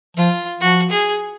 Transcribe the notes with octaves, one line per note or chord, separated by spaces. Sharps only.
F3 F4
F3 F#4
G#4